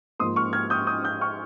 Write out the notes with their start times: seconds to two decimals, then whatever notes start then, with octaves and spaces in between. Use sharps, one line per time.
0.20 G#2 F3 A#3 C6 D#6
0.36 C#6 F6
0.53 F6 G#6
0.70 D#6 G6
0.87 D#6 G6
1.04 D#6 G6
1.21 C#6 F6